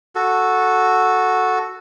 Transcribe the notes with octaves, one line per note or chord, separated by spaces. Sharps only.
F#4 A4